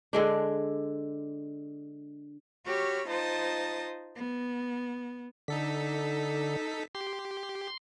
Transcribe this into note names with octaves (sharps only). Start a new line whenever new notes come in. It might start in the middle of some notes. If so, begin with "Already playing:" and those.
D3 G#3 D4
F#4 G4 C#5 B5 F6
D#4 F4 C5 A5 D#6
B3
D3 D#4 A4 B6
G4 C6